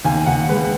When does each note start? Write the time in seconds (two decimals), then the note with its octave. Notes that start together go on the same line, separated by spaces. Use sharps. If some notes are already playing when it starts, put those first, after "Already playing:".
0.05 D#2 G#5
0.26 D#2 F#5
0.49 G#3 B4